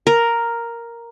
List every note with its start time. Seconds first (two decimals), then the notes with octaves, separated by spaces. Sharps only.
0.07 A#4